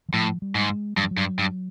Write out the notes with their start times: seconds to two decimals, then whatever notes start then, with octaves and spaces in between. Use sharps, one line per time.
0.09 E3
0.13 A2 F3
0.42 G3
0.55 G#2
0.70 G#3
0.97 G2 F#3
1.03 F3
1.11 F#3
1.17 G2
1.39 G2